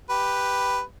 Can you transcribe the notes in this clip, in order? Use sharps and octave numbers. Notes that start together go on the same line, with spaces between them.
G4 B4